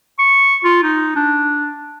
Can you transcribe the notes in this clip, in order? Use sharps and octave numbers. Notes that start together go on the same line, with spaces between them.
C#6
F4
D#4
D4